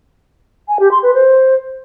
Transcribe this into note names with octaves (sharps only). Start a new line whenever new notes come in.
G#5
G4
C6
B4
C5